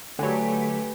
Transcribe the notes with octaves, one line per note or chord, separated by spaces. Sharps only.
D3 F#3 A3 G4 B4 G#5